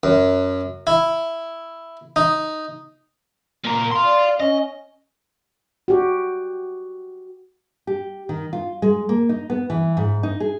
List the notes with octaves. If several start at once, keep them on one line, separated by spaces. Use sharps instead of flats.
F#2
E4
D#4
A#2 A#4
F5 C6
D5
C#4 D#5
F#4 G4
G4
D#3
F4
G#3
A#3
D#4
B3
E3
G#2
D#4
G#4